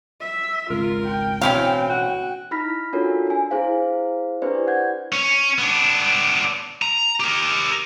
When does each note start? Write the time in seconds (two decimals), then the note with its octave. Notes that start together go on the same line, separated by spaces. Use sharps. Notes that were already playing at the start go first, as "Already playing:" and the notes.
0.20 E5
0.70 G#1 C#2 F4 A#4
1.06 G5
1.41 A1 B2 D3 C4 C#4 E4 F5
1.89 F#4
2.51 D#4 E4 B5 F6 A#6 B6
2.93 D4 F4 F#4 A4 A#4 C#5
3.27 D4 G#5
3.51 E4 G#4 C5 F5
4.42 D4 E4 G4 B4 C5 D5
4.67 F#5 G6 G#6
5.12 C#4
5.58 B3 D4
6.82 A#5
7.20 G4 A#4